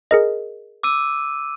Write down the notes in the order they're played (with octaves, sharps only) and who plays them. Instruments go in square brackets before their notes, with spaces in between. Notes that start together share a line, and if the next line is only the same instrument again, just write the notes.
[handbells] G#4 A#4 D#5
[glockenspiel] D6 E6 D#7